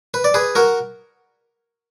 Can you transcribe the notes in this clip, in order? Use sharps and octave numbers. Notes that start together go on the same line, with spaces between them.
B4
D5
G#4 B4
F#4 A#4